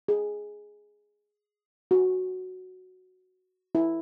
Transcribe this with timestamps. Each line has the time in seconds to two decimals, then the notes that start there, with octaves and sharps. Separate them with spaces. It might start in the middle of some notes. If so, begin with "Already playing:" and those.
0.08 G#4
1.91 F#4
3.75 E4